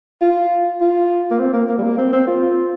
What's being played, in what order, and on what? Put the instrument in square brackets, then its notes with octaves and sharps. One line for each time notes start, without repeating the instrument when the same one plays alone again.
[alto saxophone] F4
F4
A#3
C4
A#3
A#3
G3
A#3
C4
C4
F4